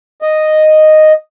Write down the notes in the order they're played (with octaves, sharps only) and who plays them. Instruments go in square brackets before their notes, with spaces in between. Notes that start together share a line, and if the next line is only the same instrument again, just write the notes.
[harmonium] D#5